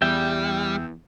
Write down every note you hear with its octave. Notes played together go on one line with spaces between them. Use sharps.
E2 G3 E5 G5